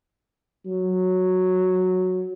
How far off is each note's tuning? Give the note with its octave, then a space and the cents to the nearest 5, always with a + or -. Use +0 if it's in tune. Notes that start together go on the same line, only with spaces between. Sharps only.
F#3 -5